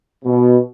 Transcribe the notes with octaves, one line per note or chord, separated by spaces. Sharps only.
B2